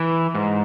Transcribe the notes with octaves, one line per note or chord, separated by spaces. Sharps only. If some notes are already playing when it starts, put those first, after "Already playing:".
Already playing: E3
G#2